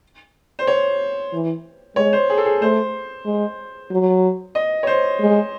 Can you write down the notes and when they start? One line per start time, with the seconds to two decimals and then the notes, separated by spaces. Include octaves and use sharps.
0.59 C5
0.67 C#5
1.33 E3
1.96 G#3 C#5
2.13 C5
2.30 G#4
2.38 A4
2.45 G#4
2.61 A3 C5
3.26 G#3
3.91 F#3
4.55 D#5
4.83 C#5
4.87 C5
5.20 G#3